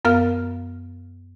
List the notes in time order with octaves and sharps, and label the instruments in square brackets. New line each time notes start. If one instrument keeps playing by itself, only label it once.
[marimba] F#2 B3 A#4 F5 F6